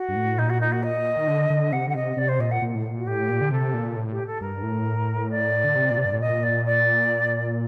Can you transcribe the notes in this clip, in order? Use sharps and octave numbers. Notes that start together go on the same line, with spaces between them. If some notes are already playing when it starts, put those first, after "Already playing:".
Already playing: F#4
G2
A2
A#2 D#4
F#4
D#4
F#4
D#5
D#3
D3
D3
C3 F#5
D3 F#5
C3 D#5
C3 D5
C5
A#2 D#5
F#5
A#2
A2
A#2
F#4
A2 G4
A#2
D3
C3 A4
A#2
A2
G4
A4
G2 A#4
A2
D5
D3
C3
A#2
C3
G2
A2
A#2 D#5
D5
D5